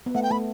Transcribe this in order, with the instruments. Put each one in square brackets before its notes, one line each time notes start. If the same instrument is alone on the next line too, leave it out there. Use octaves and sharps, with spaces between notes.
[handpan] B3
[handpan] A3 [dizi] F#5
[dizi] G5
[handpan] A3 [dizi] B5